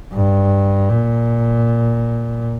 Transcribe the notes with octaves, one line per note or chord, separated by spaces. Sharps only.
G2
A#2